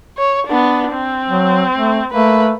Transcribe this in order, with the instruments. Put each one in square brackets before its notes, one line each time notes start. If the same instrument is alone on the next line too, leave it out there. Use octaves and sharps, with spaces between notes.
[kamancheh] C#5
B3 D4
C4
[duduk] F#3
A3
[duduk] A3 [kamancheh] A#3 B4